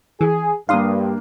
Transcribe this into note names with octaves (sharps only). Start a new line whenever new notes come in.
E3 G#4
G2 A#3 D4 F5 C6 D#6